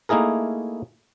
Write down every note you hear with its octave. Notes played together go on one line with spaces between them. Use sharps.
A3 A#3 D#4 E4 G#4 A#4